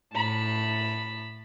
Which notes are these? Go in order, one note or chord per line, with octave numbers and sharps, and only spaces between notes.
A2 A5 B5